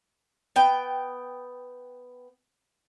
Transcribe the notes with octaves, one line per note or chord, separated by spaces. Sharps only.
B3 G5